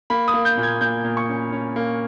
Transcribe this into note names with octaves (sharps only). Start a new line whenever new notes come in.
A#3 B5
D#6
A#3
G6
A#2
G#6
A#2 G6
A#2
C#6
C#4
C#4
A#3